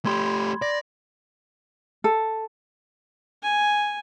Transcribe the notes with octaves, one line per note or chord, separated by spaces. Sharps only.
A3 G4 B5 C6 G#6
D5 A#6
A4
G#5